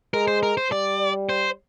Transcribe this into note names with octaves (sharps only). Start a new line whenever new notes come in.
G#3 A#4
C5
A#4
C5
G3 D5
C5